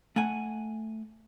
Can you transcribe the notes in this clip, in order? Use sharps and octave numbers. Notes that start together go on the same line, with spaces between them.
A3 F#5 G#5